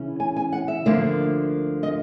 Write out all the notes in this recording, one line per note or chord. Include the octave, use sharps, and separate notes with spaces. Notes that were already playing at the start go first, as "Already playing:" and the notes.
Already playing: C#3 E3 C#4
G#5
G#5
F#5
E5
D2 D3 F3 A#3
D#5